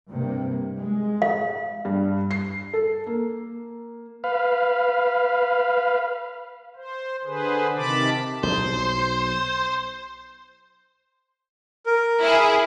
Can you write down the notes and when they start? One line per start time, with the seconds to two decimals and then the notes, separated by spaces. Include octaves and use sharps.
0.12 G2 C3 A#3
0.76 G#3
1.22 F5
1.85 G2
2.31 C7
2.73 A4
3.07 A#3
4.24 B4 F5
6.76 C5
7.24 D3 G#4 B4 C5
7.76 C3 D#3 A5 B5 D6
8.43 B1 C5
11.86 A#4
12.21 E4 G#4